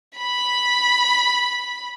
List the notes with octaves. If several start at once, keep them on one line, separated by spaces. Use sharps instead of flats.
B5